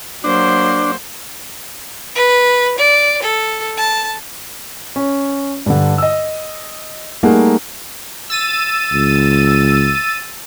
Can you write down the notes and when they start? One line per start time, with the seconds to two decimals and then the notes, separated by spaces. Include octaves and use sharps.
0.24 F#3 A#3 D4 C5
2.15 B4
2.78 D5
3.22 A4
3.77 A5
4.96 C#4
5.66 G2 D3
5.98 D#5 E6
7.23 G3 A3 A#3 D#4 G#4 F#5
8.30 E6 A6 D#7
8.93 C#2